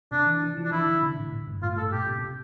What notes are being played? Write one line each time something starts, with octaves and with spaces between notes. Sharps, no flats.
C3 D4
E3
E3
F3
D4
E3 E4
D3
C3
A2
A2
G2
A2 F4
A2 A4
A#2 G4
C3
C3